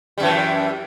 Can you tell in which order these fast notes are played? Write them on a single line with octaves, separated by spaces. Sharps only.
G3 F#2 E3